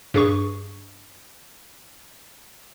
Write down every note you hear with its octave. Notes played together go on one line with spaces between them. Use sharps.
G2 G#4 C#6